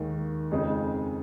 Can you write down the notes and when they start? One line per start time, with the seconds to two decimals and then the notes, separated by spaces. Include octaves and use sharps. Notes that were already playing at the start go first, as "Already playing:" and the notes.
Already playing: D#2 D#3 G#3
0.51 F2 C#3 G#3 D#4 G#4